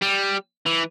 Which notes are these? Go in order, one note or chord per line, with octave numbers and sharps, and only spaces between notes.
G3
E3